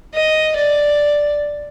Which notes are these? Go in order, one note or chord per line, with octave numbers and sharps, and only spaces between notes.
D#5
D5